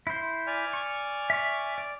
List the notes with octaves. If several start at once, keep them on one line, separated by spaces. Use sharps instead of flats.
E4 C5
D5 G#5 F6
C#6
E5 C#6
D5